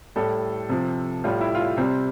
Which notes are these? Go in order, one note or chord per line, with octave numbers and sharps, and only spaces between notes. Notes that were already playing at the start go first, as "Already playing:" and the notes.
A2 G3 A4
C3 F3
A2 G3 F4
E4
F4
E4
C3 G3 C4